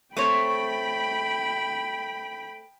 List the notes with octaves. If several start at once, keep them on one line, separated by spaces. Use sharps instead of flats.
A3 C4 C#5 G5 B5